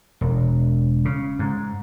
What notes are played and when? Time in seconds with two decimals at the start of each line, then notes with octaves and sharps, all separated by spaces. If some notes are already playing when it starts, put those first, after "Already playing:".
0.21 E1
1.05 C#3
1.39 G#2